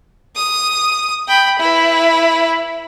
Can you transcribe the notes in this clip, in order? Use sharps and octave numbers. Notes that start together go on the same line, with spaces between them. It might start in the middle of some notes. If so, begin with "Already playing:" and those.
D#6
G5 B5
E4 B4